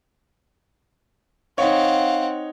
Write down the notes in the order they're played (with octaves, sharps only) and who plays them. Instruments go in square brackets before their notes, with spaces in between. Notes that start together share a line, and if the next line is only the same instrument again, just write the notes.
[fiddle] C4 F#5 [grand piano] D#4 C#5 [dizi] F5